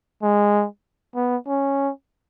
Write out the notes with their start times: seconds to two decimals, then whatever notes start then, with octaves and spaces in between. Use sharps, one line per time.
0.22 G#3
1.15 B3
1.47 C#4